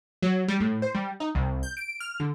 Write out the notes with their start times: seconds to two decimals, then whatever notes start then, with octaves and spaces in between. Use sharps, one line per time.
0.22 F#3
0.48 G3
0.60 A2
0.82 C5
0.95 G3
1.20 D#4
1.35 C2
1.63 G6
1.77 D7
2.00 F6
2.20 D3